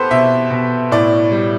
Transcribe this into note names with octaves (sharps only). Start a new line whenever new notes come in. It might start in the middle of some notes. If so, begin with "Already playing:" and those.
Already playing: B3 G4 A4 B4 C5
B2 E5
B2
A2 D5
G3